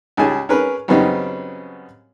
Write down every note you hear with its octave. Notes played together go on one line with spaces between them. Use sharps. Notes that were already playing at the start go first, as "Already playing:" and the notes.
C#2 G3 G#4 G#5 A5
C#4 G#4 A#4 B4
F#2 C#3 G3 B3 C4 D#4